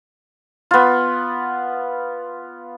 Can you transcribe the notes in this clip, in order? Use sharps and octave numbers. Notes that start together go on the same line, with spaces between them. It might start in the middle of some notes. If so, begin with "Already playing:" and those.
B3 F4